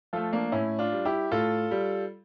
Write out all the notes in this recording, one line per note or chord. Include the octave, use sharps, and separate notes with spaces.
F3 A3 F4 A4
A#3 D4
A2 C#4 E4
D4 F4
G3
E4 G4
A2 F4 A4
G3